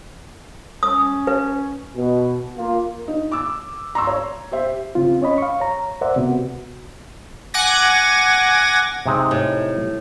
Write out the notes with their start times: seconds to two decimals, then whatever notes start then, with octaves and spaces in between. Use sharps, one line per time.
0.83 C#4 D#6
1.27 B4
1.95 B2
2.57 A#3 F4
3.08 D#4
3.32 D6 E6
3.95 A#5 C6 C#6 E6
4.07 C#5
4.52 G4 C5 E5
4.95 C#3 C4 F4
5.21 C#4 C#5 D#5 B5
5.38 F5 C#6
5.60 C#5 A#5
6.01 A#4 C5 D5 E5 F#5
6.16 C3 B3 F#4
7.54 F#5 G#5 D6 G#6 A#6
9.06 C3 G#3 D#4
9.31 A2